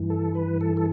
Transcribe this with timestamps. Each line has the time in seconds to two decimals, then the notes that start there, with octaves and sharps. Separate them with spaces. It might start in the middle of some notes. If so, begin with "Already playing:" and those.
Already playing: G2 E3
0.10 A4
0.35 B4
0.61 A4
0.77 A4